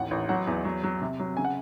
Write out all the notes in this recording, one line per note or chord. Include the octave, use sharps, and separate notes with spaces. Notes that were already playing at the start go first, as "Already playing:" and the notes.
Already playing: A1 D#2 F#5
A1
F#3 F#5
E2
F#3
F#3
C3
F#3
C#3 G#5
F#5